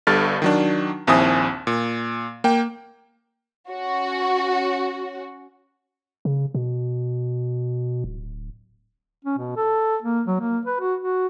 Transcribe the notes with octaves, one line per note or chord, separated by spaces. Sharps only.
G1 G2 A4 F6 A6
D#3 F#3 D4
A#1 D#2 C4 E4 G#5 D#6
A#2
A#3 G5
C#4 F#4
C#3
B2
D1
C#4
B2
A4
A#3
F#3
A#3
B4
F#4
F#4